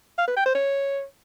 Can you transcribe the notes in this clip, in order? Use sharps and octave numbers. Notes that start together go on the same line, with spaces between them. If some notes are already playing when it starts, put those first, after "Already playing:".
F5
B4
G5
C5
C#5